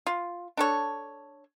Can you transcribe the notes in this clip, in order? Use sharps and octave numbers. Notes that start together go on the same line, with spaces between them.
F4
D4 A4 C#5